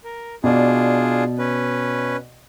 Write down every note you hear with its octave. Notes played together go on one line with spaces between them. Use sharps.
A#4
B2 D4 F4 G#4 D5
C#4 B4